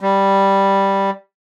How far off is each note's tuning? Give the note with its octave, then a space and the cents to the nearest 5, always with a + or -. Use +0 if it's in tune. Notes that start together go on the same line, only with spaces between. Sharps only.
G3 +0